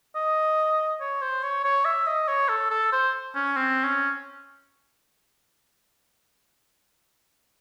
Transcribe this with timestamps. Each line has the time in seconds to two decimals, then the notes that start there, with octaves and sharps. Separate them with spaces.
0.15 D#5
1.00 C#5
1.22 C5
1.43 C#5
1.64 C#5
1.85 E5
2.07 D#5
2.28 C#5
2.49 A4
2.71 A4
2.92 C5
3.35 C#4
3.57 C4
3.84 C#4